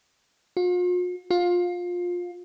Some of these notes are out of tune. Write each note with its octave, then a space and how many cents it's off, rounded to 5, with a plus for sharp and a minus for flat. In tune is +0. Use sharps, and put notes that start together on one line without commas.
F4 +45
F4 +20